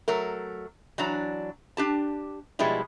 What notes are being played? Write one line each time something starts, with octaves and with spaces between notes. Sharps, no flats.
F#3 A3 A#4
E3 F#3 D4 A#5
D4 G4 A5
B2 F3 G3 G#3 E4